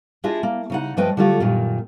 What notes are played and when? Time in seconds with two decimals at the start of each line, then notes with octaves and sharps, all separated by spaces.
0.24 D4 E4 F4 G#4 D#5 E5
0.43 A#3
0.70 C#3 D#4 F#5
0.97 G2 F3 A3 B4 D#5 G5
1.17 D3 F#3 G3 A3 F4 F#4
1.40 F#2 A#2 D#3